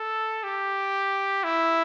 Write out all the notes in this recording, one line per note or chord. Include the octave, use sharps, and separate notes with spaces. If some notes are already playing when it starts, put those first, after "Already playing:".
Already playing: A4
G4
E4